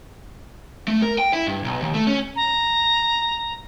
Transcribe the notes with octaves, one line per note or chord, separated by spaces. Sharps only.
A3
A#4
G5
E4
G2
B1
D#2
A3
C#4
A#5